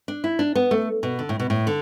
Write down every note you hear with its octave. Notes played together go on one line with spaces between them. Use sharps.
D4
E4
D4
B3
A3
B2
D3
A2
B2
A2
D3